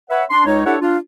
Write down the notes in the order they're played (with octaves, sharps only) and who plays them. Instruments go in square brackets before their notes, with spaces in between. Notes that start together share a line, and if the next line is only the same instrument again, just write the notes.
[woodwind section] B4 C#5 E5 F#5
D4 C6
C#2 D#4 C#5
D4 E4 G4 A4 C#5 F#5
D4 F4